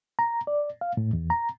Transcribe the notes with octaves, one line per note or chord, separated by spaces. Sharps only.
A#5
D5
F5
A2
E2
A#5